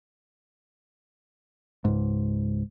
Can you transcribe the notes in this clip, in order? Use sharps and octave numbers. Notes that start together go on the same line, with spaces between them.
C#2 G#2